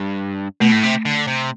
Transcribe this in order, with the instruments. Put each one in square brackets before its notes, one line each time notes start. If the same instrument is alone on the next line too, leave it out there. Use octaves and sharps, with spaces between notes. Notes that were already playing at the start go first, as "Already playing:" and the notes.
Already playing: [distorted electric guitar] G2
[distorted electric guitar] B2 [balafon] A3
[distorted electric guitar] A2
C3
D3
C3